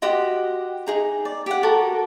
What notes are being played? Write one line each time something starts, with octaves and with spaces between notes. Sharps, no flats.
F#4 G4 D#5 C6
D#4 G#4 A#5
D5
G4 F#5
F#4 A4 A#4